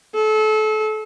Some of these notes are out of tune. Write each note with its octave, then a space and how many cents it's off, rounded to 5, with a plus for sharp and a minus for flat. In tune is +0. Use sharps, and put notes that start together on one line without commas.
A4 -30